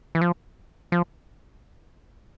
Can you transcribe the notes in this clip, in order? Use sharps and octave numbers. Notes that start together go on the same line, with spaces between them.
E3
F3
F3